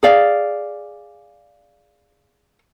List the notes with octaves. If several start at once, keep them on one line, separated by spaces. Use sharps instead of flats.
G#4 D5 F5